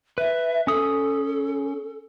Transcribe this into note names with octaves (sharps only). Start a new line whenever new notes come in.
B4 E5
C#4 A4 D#6